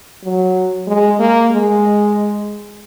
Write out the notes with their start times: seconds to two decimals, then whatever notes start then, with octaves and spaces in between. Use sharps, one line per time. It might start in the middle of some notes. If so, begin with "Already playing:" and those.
0.24 F#3
0.88 G#3
1.19 A#3
1.51 G#3